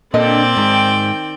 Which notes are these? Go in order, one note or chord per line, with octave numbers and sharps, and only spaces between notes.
A#2 D3 C4 D4 D5 D#5 G5
G#2 D#3